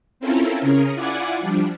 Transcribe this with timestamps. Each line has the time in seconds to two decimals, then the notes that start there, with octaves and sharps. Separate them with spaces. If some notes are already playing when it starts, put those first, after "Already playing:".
0.20 C4 C#4 E4 F4 A4 A#4
0.61 C#3 C#4 G#4 A#4
0.95 E4 F4 D5 F#5 G#5 D6
1.40 F3 G3 D4